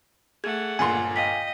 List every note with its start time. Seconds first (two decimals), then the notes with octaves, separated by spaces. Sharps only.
0.44 A3 G#4 F#5 G#6
0.79 G1 A#2 G#5 C6
1.16 D#5 F5 G5 B6